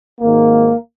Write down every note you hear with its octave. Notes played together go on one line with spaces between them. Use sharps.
G#1 G#2 D#3 A#3